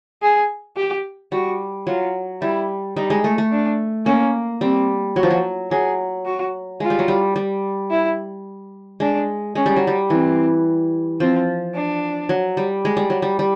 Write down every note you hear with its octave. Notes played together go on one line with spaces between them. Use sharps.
G#4
G4
G3 F#4
F#3 F4
G3 E4
G3 D#4
G#3
A3
A3
D4
A#3 C#4
G3 C4
F#3 F#4
F3
F#3
F#3 G#4
F#4
G#3 F4
G3
F#3
G3
G3
E4
G#3 D4
G#3 C#4
G3
F#3
G3
E3 C4
F3 C4
D4
F#3
G3
G#3
G3
F#3
G3
G3